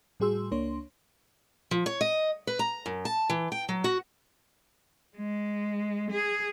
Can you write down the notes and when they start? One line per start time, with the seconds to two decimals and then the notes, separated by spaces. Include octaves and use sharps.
0.20 A2 G3 F#4 G#4 C6 E6
0.51 C#2 A#3 D4 C#5 C6
1.71 F3
1.86 C#5
2.01 D#5
2.47 B4
2.59 A#5
2.86 F#2
3.05 A5
3.30 E3
3.52 G5
3.69 F#3
3.84 F#4
5.17 G#3
6.11 G#4